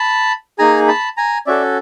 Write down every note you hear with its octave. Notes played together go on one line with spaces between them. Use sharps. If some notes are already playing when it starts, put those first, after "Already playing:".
Already playing: A5 B5
A#3 D#4 G#4 G#5 A#5
A5 B5
G#5 A#5
C#4 F#4 A4 D5 E5